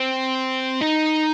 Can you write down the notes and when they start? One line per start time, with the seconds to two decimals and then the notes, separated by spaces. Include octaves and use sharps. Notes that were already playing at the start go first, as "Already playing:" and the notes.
Already playing: C4
0.81 D#4